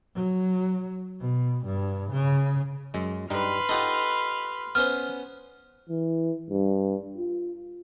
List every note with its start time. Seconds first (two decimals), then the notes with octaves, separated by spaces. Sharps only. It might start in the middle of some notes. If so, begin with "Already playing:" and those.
0.16 F#3
1.20 B2
1.66 G2
2.12 C#3
2.94 F#2 G#3
3.30 G2 G3 D#4 B4 C6 F6
3.69 D#4 F4 G4 A4 F#5
4.75 B3 C#4 C5 F6
5.90 E3
6.50 G2
7.18 F4